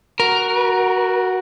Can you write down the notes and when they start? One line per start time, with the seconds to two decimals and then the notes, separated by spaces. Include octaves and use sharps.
0.20 F#4 A#4